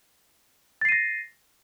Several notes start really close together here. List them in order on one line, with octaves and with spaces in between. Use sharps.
A6 C7 D#7 A#6